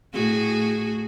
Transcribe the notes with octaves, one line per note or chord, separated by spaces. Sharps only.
A2 F#4 G#4